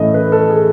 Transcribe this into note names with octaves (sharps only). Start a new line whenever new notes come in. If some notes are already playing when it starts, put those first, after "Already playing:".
Already playing: A2 E3 A3 C#4 D#5
B4
A4
G#4